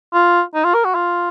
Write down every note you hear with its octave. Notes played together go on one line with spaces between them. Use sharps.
F4
D#4
F4
A#4
F#4
F4